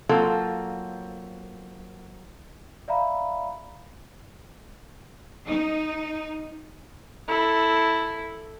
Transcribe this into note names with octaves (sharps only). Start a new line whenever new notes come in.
F#3 A#3 C4 F4 A4
D5 E5 F5 A#5 B5
D#4
E4 A4